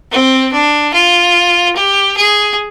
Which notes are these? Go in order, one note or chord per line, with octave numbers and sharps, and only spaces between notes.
C4
D4
F4
G4
G#4